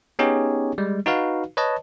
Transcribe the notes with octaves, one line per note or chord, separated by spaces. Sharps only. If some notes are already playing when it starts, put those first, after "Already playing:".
B3 C#4 D#4 G4 G#4 C#5
G3 G#3
D#4 F#4 B4 F5
B4 C#5 D#5 A5